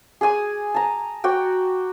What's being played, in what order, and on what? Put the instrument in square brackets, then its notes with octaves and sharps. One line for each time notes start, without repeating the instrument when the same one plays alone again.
[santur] G#4 D5 G#5 D#6
A5 A#5
F#4 D5 G5